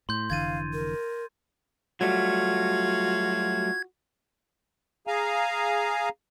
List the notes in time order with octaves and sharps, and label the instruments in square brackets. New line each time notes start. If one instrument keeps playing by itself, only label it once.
[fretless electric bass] A2 [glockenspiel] C6 G6
[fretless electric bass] F1 D3 E3 [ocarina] F5 [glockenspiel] G#6 A6 D#7
[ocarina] A#4
[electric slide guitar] F#3 G3 A3 [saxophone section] F4 F#4 [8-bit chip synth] G#6
[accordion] G#4 F5 G#5 A#5